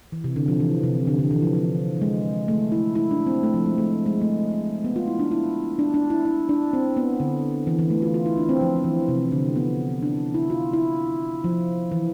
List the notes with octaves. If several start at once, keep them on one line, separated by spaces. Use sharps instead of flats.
E3
C3
D3
F3
E3
C3
D3
D3
E3
F3
F3
G#3
A3
E4
E4
D4
C4
A3
F3
G#3
A3
G#3
A3
B3
F4
E4
D4
E4
D4
D4
E4
E4
D4
C4
B3
D3
E3
E3
A3
F4
F4
E4
D4
C4
F3
E3
C3
D3
B3
D4
E4
F4
E4
F3
E3